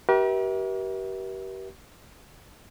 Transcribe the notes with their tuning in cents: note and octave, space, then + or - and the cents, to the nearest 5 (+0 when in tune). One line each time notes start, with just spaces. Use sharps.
G4 -35 A#4 +45 E5 -25